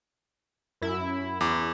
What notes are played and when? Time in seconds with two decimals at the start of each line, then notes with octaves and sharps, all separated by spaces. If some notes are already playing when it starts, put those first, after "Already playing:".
0.82 F#2 E4
1.41 E2 D6